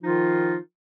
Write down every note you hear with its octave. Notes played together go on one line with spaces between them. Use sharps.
D#3 F3 D#4 F4